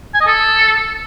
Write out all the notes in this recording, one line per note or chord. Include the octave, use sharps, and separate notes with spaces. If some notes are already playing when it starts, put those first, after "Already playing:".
G#5
D#5
A4